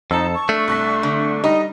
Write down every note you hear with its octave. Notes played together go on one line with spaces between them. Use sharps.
F2 D#4 A4 A5 E6
C#6
A3 D4
C2 F#6 B6
D3
G3 D#4 D#5